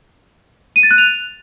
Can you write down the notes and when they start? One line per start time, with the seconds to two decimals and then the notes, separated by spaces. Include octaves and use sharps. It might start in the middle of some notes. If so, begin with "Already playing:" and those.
0.76 D#7
0.83 A6
0.91 F#6
0.98 F7